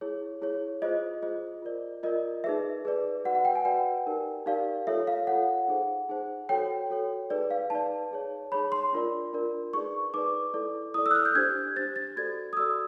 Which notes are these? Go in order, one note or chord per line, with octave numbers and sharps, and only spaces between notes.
E4 G#4 C#5
E4 G#4 C#5
F4 G#4 C5 D#5
F4 G#4 C5 D#5
F4 A#4 D5
F4 A#4 D5 D#5
D#4 G#4 B4 D5 E5
D#4 G#4 B4 D5
F#4 B4 D5 F#5
F#5
G5
G#5
F#4 B4 D5 G5
D#4 G4 A#4 D5
D#4 G4 A#4 D5 F5
F4 A4 C#5 E5
F5
F4 A4 C#5 F#5
D#4 G#4 C5
D#4 G#4 C5
F#4 A4 C#5 G5
F#4 A4 C#5
D#4 G#4 B4 D5
F5
D#4 G#4 B4 D5 A5
D#4 G#4 C#5
D#4 G#4 C#5 B5
C6
D4 F4 A#4 D5
D4 F4 A#4 D5
D#4 G#4 B4 D5 C#6
D#4 G#4 B4 D5 D6
E4 A4 D5
E4 A4 D5 D#6
E6
F#6
F6
G6
D4 G4 C5 G#6
D4 G4 C5 A6
A6
F#4 A4 D5 G#6
D#6
F#4 A4 D5 E6